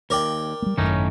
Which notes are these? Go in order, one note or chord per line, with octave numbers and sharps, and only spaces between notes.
D#2 A#4 D5 G5
G3 A#3
G#1 F#2 A2 D#3 C#4 D#4